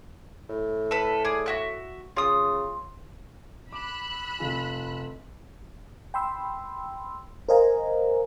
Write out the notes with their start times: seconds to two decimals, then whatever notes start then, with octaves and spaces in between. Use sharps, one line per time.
0.49 A2
0.91 A4 B4
1.25 G#4 D5
1.46 F#4 E5 F#6
2.16 C#3 F4 D#6
3.72 B5 D6 E6 F#6
4.39 F1 F4 G#5
6.14 G5 B5 C6 E6
7.49 A#4 C5 D#5 F5 G#5 A#5